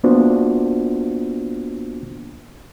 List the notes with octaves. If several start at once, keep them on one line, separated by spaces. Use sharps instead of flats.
A#3 B3 D4 F4 F#4 C5